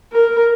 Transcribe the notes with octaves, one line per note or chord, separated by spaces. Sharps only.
A#4